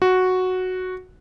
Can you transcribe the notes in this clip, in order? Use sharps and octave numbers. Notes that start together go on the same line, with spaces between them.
F#4